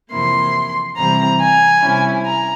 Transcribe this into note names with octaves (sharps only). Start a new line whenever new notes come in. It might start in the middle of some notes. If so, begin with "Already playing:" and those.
F2 C3 E3 A#3 E4 C6
C3 E3 G3 C4 E4 A#5
G#5
C3 G3 C#4 E4
A#5